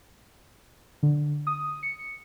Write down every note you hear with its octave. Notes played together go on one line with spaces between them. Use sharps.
D3
D#6
C#7